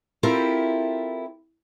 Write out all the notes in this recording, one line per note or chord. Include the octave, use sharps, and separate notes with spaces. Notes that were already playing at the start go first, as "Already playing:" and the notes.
C4 E4 F4 G4 A4 A#4